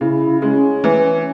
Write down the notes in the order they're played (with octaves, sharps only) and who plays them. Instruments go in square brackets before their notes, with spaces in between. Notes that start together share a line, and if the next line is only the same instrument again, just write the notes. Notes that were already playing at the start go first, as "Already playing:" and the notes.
[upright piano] C#3 [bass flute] E4
[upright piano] G#3 [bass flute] C#4
[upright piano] E3